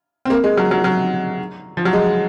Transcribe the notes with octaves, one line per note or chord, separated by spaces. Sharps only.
C4
A#3
G#3
F#3
F#3
F#3
F3
F#3
G#3